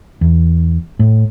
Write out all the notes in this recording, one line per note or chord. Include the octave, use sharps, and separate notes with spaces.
E2
A2